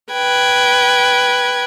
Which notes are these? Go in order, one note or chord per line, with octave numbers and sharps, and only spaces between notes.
B4 G5 G#6